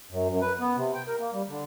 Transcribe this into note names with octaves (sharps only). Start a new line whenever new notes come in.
F#2
F#2
B4
B3
C3
G5
A#4
A#3
G3
D3